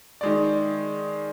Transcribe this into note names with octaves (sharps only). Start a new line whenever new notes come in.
D#3 G#3 D5